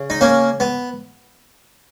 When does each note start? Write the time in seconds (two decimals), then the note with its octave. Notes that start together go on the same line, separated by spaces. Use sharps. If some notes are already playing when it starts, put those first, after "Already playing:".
Already playing: C#3
0.10 D#4
0.21 A#3 C#4
0.60 B3